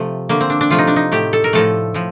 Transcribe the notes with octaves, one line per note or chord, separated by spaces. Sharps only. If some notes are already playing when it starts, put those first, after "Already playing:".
Already playing: C3 F3 A3
D3 A3 A#3
C4
D4
D4
C3 F3 A3 F4
D#4
D4
D#4
A2 A3 G4
A4
A#4
A2 F3 A3 A4
A2 F3